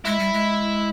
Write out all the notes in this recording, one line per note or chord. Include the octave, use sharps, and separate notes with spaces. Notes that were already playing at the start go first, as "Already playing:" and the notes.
G#3 E4
G3
G#3